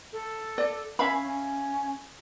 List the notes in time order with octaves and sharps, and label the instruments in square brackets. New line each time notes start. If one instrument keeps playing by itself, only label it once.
[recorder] A4
[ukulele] D5
[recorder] C#4 [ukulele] E5 F5 B5
[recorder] C#4